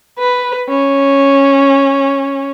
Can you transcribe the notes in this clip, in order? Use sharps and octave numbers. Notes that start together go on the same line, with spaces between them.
B4
C#4